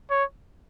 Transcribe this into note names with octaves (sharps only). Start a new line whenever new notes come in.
C#5